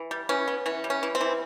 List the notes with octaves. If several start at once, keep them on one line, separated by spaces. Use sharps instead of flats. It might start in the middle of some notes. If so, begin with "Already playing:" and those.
Already playing: E3
G3
E3 C#4
B3
E3 C#4
G3
C#4
E3
C4
E3